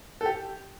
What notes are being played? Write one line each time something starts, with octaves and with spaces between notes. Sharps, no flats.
A4
G4